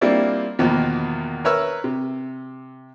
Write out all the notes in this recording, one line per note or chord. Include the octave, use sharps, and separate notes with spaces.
G3 A#3 C4 D4 E4 F4
E2 B2 D#3 F3 A#3
A#4 B4 C#5 E5 E6 F6
C3